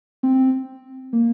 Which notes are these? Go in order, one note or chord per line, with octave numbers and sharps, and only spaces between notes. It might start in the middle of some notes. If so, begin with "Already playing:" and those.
C4
A#3